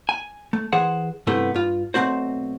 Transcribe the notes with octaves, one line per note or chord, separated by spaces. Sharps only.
G#5
A3
E3 G#4 C5 F#5
G2 C3 A3 B3 E4
G2 F4
B1 A3 C4 F#4 C5